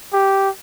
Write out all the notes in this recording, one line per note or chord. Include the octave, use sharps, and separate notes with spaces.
G4